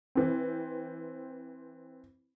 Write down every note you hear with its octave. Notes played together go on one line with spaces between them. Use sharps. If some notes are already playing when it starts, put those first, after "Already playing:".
E3 C4